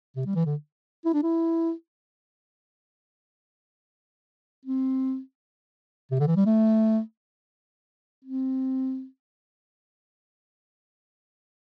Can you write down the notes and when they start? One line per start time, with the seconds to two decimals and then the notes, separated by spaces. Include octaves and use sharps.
0.16 C3
0.26 G3
0.35 E3
0.46 D3
1.05 E4
1.14 D4
1.23 E4
4.65 C4
6.11 C3
6.19 D3
6.27 E3
6.36 G3
6.46 A3
8.24 C4